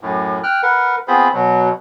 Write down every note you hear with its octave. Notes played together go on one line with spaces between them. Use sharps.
F#2 A2
G5 F6 F#6
A#4 B4 F#5
B3 C4 F4 G#4 C5 B5
B2 F#3